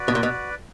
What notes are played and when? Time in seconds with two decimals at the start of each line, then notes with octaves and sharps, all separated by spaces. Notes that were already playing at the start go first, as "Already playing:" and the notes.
Already playing: F#4 B4 D5
0.08 B2
0.15 A#2
0.23 B2